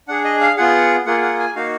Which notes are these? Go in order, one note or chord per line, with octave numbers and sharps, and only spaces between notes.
D4 G#4 F#5
D#5
F5
B3 F4 G#4 F#5
A#3 F4 G#4 F#5
F#5
G#5
A#3 D#4 F#4 F5